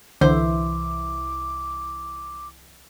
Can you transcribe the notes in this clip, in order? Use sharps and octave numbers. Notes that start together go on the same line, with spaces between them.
C2 D3 E3 C5 E5 D6